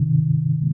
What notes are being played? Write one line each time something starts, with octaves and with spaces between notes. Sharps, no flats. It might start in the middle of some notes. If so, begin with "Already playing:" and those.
Already playing: C3 D#3